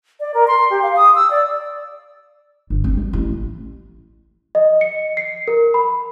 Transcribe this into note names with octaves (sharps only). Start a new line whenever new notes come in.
D5
A#4
C6
G4
F5
D#6
E6
D5
G1
C4
G3
A1
D#5
C#7
C7
A#4
B5